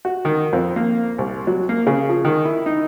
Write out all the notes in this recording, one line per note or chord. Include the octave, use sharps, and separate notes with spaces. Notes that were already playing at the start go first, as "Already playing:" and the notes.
F#4
D#3
F2
A#3
C2
F#3
A#3
C#3
F3
D#3
E4
D#4